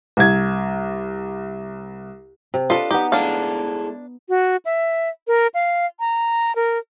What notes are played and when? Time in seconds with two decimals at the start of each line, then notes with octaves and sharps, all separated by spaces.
0.17 C2 G#6
2.54 C3
2.70 D4 F4 A4 B4 D#5
2.91 B3 D#4 G4
3.12 G#3 D4 E4 A4 F5
4.29 F#4
4.65 E5
5.27 A#4
5.54 F5
6.00 A#5
6.56 A#4